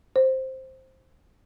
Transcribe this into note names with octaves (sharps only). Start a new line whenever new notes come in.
C5